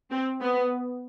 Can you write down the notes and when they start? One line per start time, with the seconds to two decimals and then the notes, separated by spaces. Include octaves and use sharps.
0.11 C4
0.40 B3